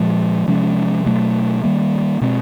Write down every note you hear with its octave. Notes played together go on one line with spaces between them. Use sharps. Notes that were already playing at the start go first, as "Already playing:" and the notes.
Already playing: A#2 F3 G#3
C3 F3 G#3 C#4
B2 F#3 A3
D#3 G3 A#3
B2 G#3 C4